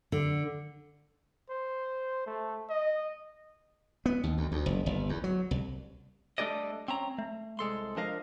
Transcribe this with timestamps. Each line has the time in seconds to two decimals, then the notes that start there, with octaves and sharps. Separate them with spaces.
0.12 D3
1.50 C5
2.26 A3
2.69 D#5
4.06 B3
4.24 D#2
4.38 D2
4.52 D2
4.66 F#1
4.86 G1
5.09 E2
5.24 F#3
5.51 C2
6.38 G3 A3 D4 G#4 D5 D#5
6.88 C4 C#4 A#5
7.18 A3
7.59 C2 G#3 A4 C6
7.97 F3 D4 A#4 D#5 F5